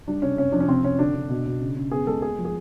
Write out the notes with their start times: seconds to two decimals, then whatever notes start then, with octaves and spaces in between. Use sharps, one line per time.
0.07 G3 D4
0.22 C3 C#4
0.37 C3 C#4
0.52 F3 D4
0.60 C#4
0.68 C3 C4
0.84 C3 C#4
0.99 D3 D4
1.14 D3
1.29 B2
1.46 B2
1.61 C#3
1.76 C#3
1.91 B3 G#4
2.07 G#3 A4
2.22 A#3 G#4
2.38 F3
2.45 G#4